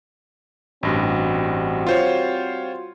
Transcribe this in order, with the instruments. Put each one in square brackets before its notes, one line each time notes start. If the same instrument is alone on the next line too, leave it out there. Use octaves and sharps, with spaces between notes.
[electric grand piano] A1 G2 [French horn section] G3 C4 F#4
[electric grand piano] F4 C5 C#5